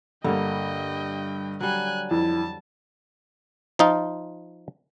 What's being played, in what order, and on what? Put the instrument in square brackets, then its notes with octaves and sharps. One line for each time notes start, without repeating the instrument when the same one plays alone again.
[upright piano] G2 [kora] D3 G3 A#3 [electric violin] D#5 G5
[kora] F#3 G3 [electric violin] G#5 F#6
[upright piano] F2 [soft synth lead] E4 [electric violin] A5
[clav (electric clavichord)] F3 D#4 F4